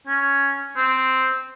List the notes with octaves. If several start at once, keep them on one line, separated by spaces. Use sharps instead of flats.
C#4
C4